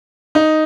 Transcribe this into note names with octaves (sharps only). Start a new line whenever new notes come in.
D#4